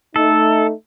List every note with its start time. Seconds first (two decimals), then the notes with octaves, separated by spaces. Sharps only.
0.16 A3 D#4 A4